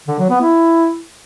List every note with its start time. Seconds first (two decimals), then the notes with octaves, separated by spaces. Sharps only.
0.08 D3
0.19 F#3
0.30 B3
0.41 E4